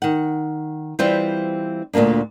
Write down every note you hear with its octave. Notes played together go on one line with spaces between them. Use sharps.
D#3 F#5
E3 G3 C4 F4 C5
D2 A#2 C#3 A#3 D4